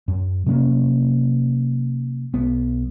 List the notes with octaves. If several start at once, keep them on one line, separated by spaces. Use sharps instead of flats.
F#2
C3 F#3 A#3 C#4
B1 B3